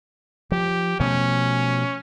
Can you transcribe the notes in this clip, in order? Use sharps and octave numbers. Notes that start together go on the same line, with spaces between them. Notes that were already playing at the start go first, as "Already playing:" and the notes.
F3 G4
B2 F3 A3 C#4